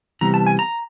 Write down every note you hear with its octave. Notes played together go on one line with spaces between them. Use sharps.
C3 E3 G3 B3 A#5
A5
G#5
A#5